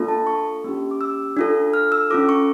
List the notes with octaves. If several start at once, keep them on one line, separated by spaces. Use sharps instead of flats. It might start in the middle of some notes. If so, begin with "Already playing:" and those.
Already playing: A#3 D4 F4 A4
A5
C#6
A#3 C#4 G4
D6
E6
D4 F4 A4
F6
E6
C#4 F4 A4 D6
C#6